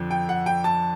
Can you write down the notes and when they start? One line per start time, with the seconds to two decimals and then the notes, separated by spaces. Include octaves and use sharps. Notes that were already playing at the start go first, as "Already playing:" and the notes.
Already playing: F2 D3
0.11 G5
0.29 F#5
0.46 G5
0.64 A5